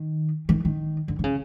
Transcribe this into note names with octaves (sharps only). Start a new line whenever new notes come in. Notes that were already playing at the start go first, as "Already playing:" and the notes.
Already playing: D#3
D#3
D#3
D3
D3
C#3